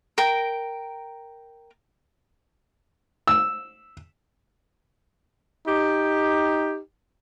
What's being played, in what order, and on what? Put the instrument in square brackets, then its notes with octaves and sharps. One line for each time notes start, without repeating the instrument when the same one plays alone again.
[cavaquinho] A#4 G5 A#5
[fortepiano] E6
[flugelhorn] D#4 [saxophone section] G4